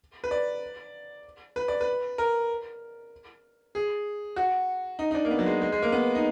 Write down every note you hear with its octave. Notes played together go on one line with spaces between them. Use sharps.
B4
D5
B4
D5
B4
A#4
G#4
F#4
D#4
D#4
D4
A#3
B3
F#3
G#3
G#3
G#3
A#3
B3
D#4